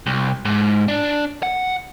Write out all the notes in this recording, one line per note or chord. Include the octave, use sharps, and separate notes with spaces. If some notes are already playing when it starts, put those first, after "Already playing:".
C2
G#2
D4
F#5